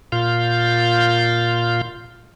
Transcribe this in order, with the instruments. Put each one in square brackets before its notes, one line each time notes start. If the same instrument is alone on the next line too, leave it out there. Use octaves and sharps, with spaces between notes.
[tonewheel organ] A#2 F4 F5 G6